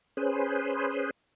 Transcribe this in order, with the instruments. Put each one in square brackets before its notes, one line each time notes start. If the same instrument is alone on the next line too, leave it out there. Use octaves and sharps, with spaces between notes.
[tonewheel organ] C#4 G#4 B4 C5